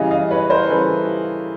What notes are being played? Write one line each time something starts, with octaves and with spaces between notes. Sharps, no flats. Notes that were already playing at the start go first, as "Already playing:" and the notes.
Already playing: C#3 E3 G3 D#5 F5
D#5 F5
B4 C#5
A#4 C5
C#3 E3 G3 A4 B4